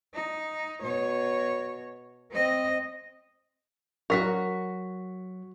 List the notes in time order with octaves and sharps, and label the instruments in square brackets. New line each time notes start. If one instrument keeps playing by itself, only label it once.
[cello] D#4
B2 C#5
C4 D#5
[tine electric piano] F#3 [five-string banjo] F#4 A#4 [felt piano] C#6 B6